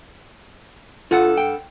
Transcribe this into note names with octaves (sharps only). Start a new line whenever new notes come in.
G2 F4 A4 F#5
G5